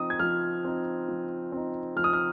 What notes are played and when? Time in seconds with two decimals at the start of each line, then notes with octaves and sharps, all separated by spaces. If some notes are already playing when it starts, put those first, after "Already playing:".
Already playing: F3 C4 D#4 D#6
0.10 G#6
0.19 F3 F6
0.64 C4 D#4
1.09 F3
1.52 C4 D#4
1.96 F3 F6
2.04 D#6
2.13 F6